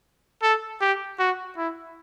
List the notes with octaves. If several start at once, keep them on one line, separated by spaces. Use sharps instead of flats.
A4
G4
F#4
E4